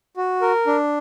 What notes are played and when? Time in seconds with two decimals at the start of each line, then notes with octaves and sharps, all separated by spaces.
0.17 F#4
0.42 A#4
0.67 D4